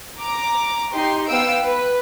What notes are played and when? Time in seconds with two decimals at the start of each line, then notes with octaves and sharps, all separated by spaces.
0.21 A#5 D6
0.94 D#4 G4 C6
1.29 B3 F5 G5 E6 D7
1.64 B4